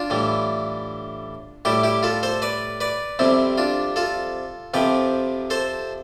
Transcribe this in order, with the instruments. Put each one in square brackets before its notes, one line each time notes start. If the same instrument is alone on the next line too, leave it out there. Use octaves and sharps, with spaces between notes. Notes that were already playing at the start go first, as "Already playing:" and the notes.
Already playing: [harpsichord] D4 F4
A2 E3 G3
A2 G3 E4 G4
E4 G4
F4 A4
A4 C5
B4 D5
B4 D5
F2 C3 G3 C4 E4
D4 F4
F4 A4
F2 C3 F3 G4 B4
A4 C5